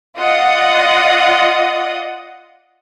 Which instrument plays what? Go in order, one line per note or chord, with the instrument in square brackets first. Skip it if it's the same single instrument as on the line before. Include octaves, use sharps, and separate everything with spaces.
[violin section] F4 D5 D#5 F#5 D#6